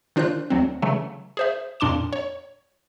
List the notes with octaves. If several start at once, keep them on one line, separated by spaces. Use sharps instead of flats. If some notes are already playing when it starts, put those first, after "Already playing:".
D#3 D4 F4 C5 F#6
D2 F#3 C4
C#3 E3 F#3 A3
G#4 C5 E5
F2 A#2 D4 C6 D6 E7
C#5